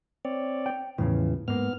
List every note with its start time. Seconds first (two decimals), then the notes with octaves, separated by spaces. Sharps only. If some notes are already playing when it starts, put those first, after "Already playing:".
0.25 C4 C#5 D5
0.66 G5
0.98 E2 A2 C#3 E3 F3
1.48 G#2 A#3 B3 F6